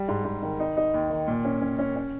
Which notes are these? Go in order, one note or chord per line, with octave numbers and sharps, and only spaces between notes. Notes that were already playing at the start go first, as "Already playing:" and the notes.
Already playing: G3
G#2
G#2
D#3
D#4
D#4
D#2
D#3
A#2
C#4
C#4
C#4
C#4